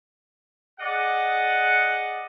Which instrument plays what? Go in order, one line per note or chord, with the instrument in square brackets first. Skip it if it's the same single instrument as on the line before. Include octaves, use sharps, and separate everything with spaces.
[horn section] G#4 D5 D#5 F#5